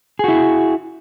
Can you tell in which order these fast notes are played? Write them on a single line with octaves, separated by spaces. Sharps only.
G#4 F#4 E4